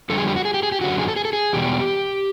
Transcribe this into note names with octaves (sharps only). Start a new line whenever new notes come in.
F2 D3 G3 A4
G#4
G4
F#4
G#4
G4
G#4
G4
F#2 D3 F#3 F#4
G#4
A4
G#4
A4
G#4
E2 B2 G3 G4